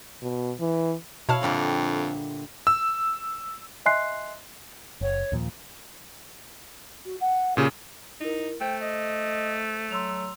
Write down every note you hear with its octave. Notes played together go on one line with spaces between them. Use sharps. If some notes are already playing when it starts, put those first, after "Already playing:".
B2
E3
B2 E4 C#5 F5 A5 F6
F2 A#2 D3 G3
E6
D#5 E5 G#5 C6 F#6 C7
F#1 C#5
D#2 A#2 F3
F#4
F#5
A#2 C#3 G4
D#4 E4 A#4
A3 C5 G5
D#5
F#3 C6 E6 F7